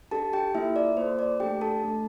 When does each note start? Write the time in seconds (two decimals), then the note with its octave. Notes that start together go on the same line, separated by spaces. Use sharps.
0.11 D4 G4 A4 A5
0.33 G4 G5
0.55 A#3 E4 F4 A4 E5
0.76 D5
0.97 A#3 F4 A4 C5
1.19 D5
1.40 A3 D4 G4 A4 G5
1.61 A4 A5
1.83 A3 D4 A4